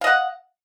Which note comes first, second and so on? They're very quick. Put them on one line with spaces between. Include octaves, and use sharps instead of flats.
F5 D#5 F#5